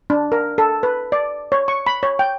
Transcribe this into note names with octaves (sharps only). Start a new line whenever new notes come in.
D4
A#4
A4
B4
D5
C#5
C#6
B5
C#5
G5